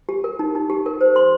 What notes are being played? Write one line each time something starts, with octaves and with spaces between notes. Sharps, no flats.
G4
A#4
D#4
D#4
G4
A#4
C5
C6